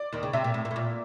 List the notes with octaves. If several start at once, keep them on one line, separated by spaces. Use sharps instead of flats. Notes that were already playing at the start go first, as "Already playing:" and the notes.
Already playing: D5
D#2 D#3
C#3
C3 E5
A#2
A2
A#2
A2
A#2